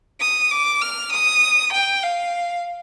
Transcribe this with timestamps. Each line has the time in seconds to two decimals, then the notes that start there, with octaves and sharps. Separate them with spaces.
0.21 D#6
0.51 D6
0.81 F6
1.12 D#6
1.73 G5
2.03 F5